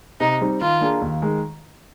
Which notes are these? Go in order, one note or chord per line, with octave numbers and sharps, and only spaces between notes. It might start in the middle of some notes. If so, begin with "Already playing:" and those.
C3 D#4
G3 C4 D#4
D#3 F4
A#3 D4 G#4
D#2
D#3 G#3